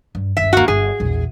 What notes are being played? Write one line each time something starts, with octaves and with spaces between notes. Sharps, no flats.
G2
G1 D#2 E5
A#3 F#4
G1 G#4
A#1 E2